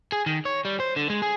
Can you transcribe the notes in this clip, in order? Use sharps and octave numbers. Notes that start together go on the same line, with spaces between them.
G#4
D#3
C#5
G3
C5
D3
G#3
G#4